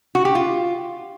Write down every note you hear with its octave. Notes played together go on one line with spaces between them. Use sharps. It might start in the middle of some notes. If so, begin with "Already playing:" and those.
F#4
G4
F4